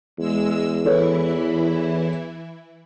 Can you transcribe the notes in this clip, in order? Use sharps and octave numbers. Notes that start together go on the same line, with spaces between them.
E2 G#3 E6
E3 E4 A4 B4 C#5